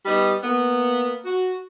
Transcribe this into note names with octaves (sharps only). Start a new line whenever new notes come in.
G3 B3 D#4
A#3 B3
F#4